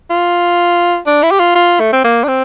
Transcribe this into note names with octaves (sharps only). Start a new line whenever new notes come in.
F4
D4
E4
G4
F4
F4
A3
C4
A#3
D4
C4